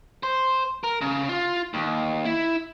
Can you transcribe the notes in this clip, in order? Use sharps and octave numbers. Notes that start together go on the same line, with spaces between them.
C5
A#4
C#3
F4
D#2
E4